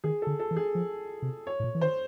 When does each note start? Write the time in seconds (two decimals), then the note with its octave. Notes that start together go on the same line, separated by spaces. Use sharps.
0.04 D#3 G#4
0.22 D3 A4
0.39 A4
0.51 E3
0.56 G#4
0.75 F3
1.22 C3
1.47 C#5
1.60 A2
1.64 A#2
1.75 E3
1.81 D#3 C5